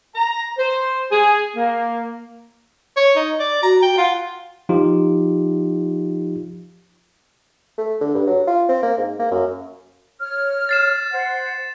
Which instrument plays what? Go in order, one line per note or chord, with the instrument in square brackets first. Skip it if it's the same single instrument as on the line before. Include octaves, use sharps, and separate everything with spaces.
[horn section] A#5
C5
G#4
A#3
[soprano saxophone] C#5
D#4
D5
[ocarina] F#4 [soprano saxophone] A#5
[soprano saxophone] G5
[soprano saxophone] F4 [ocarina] F#5
[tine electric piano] F3 D#4 F4 G4
[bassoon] A3
D3
G2
F#3
F4
C4
A#3
G#2
A#3
F#2
[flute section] C#5 F6
[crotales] A6 C7 E7
[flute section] C5 F#5